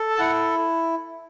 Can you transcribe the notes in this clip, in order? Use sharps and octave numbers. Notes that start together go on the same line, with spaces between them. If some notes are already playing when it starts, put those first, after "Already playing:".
Already playing: A4
A5
E4 F#5